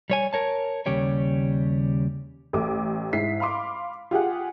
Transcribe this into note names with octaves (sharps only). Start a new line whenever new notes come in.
G3 C#5 G#5
A#4 C#5 A5
D#2 C#3 G3 G4 C#5
A1 A3 D6
G#2 E4 B6 C7
F5 B5 C6 D6
F4 G4 G#4 F#5